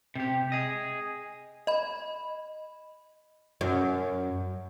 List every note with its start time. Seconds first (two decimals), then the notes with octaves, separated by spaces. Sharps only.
0.15 C3 G4
0.52 G#4 D#5
1.67 D#5 B5
3.61 F#2